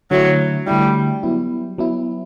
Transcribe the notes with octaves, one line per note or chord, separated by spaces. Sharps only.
D3 F#3 A3 E4
D3 G3 A3 E4
F#3 B3 E4
F#3 B3 E4